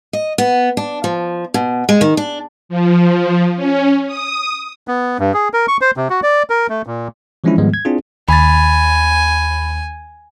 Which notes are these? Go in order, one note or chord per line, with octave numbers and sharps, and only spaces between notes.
D#5
B3
D4
F3
B2
G#3
D#3
D4
F3
C#4
D#6
B3
G2
G#4
A#4
C#6
C5
C3
F#4
D5
A#4
A3
A#2
E3 F3 G#3 C#4 D4 E4
G#2 D#3 F3 G3 G#3 B3
G#6
C4 D4 E4 F4 G#4
D#2 G#5 B5 A6